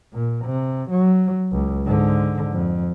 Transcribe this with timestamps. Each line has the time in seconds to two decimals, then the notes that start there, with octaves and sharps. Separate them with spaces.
0.13 A#2
0.45 C3
0.90 F#3
1.52 C#2
1.85 G#2 D3
2.52 F2